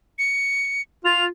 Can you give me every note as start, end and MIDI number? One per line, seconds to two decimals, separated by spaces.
0.19 0.81 97
1.05 1.24 65
1.05 1.25 101